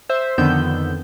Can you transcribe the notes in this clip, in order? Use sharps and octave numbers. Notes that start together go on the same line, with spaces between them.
C5 E5
F2 D3 D#3 B3 E6 G6